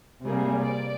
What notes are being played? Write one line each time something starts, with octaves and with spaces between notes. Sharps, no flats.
C3 G3 A#3 G#4
D5